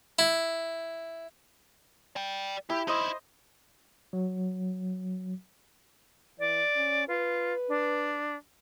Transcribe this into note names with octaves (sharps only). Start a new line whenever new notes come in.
E4
D5 G5
E4 G4
D#4 E4 C5 D#5
F#3
E3 D5
C#4
F4 B4
D4